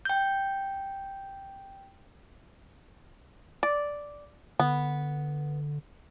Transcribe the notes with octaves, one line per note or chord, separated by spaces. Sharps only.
G5 G6
D5
D3 B3